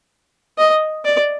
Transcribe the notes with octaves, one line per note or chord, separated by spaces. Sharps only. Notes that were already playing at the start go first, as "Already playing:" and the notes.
D#5
D5